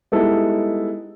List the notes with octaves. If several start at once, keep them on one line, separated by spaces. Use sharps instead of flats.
G3 G#3 B3 D#4 E4 A4